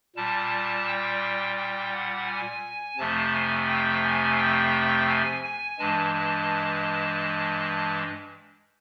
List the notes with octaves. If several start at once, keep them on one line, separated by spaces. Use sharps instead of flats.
A#2 G3 A5
G5
G5
F#5
G#5
F2 C3 F3 A3 A5
G#5
G5
G#5
G5
G#5
G#5
G2 E3 G#3 A5
A5